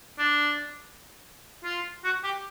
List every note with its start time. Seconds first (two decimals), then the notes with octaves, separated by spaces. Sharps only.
0.18 D4
1.64 F4
2.04 F#4
2.24 G4